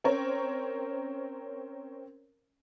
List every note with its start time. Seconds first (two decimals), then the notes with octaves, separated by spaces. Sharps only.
0.04 C4 C#4 A#4 C5 C#5